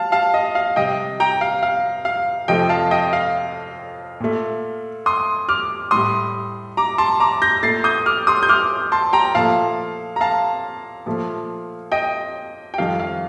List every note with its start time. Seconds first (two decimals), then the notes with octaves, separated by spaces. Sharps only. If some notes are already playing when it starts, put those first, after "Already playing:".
Already playing: F5 A5
0.12 F5 A5
0.34 D#5
0.55 F5
0.76 C3 G3 D#5 G5
1.20 G5 A#5
1.41 F5
1.63 F5
2.05 F5
2.48 F2 C3 F3 A3 D#5 G5
2.69 F5 A5
2.91 D#5 G5
3.13 F5
4.20 A#2 A3
5.06 C6 D#6
5.49 D6 F6
5.91 A2 G3 C6 D#6
6.77 A#5 D6
6.98 A5 C6
7.20 A#5 D6
7.42 G6 A#6
7.63 A#2 A3 A6 C7
7.84 D#6 G6
8.06 D6 F6
8.27 C6 D#6
8.43 G6
8.49 D6 F6
8.92 A5 C6
9.13 G5 A#5
9.35 A#2 F3 A3 F5 A5
10.16 A#5
10.21 F5 A5
11.06 A#2 F3 A3
11.92 D#5 G5
12.74 G5
12.78 F2 D#3 G3 F5
13.00 F5